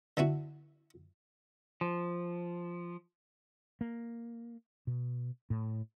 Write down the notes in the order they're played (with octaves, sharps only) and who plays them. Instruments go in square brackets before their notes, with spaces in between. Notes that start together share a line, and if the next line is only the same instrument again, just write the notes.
[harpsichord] D3 B3 E4 F#4
[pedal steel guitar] F3
[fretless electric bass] A#3
B2
A2